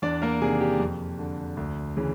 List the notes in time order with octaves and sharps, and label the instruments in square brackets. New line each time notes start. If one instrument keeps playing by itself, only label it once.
[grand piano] E2 D4 D5
A#3 A#4
C3 D#3 G#4
G4
F2
D3
D2
C#3 E3